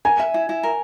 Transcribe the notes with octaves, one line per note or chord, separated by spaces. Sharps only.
A#4 G#5
E5
E4
E4
A#4